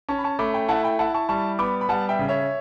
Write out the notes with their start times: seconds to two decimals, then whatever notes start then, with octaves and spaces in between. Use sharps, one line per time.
0.09 C#4 A5 C#6
0.19 B5
0.24 A5 C#6
0.39 A3 B5 D6
0.54 G5 B5
0.68 E4 F#5 A5
0.83 G5 B5
0.99 E4 F#5 A5
1.14 A5 C#6
1.29 G3 A5 C#6
1.59 B3 B5 D6
1.81 B5
1.89 G3 F#5 A5
2.09 E5 G5
2.19 C#3
2.28 C#5 E5